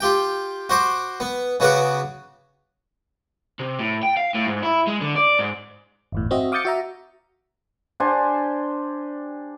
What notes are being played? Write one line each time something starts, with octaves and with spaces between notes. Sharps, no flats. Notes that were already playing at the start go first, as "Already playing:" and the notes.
F4 G4 G5
F#4 C5 D6
B3
C#3 B3 F#4 B4 F#5 D6
C3
A2
G5
F5
A2
G#2
E4
G#3
D3
D5
G#2
G1 E2 A2
C4 F#4 D#5 E5
F5 D6 D#6 G6 A6 C#7
F#4 E5 A#5
D4 G4 C5 G#5